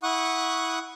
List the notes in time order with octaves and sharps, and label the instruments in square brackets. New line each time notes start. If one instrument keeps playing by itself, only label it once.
[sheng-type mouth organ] E4 F#5 C#6 D#6 F#6